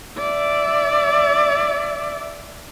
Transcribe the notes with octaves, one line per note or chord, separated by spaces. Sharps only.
D5 E5